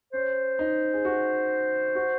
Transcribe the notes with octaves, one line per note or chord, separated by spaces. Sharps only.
C#4 C5
D#4
G#4
F#4
F#4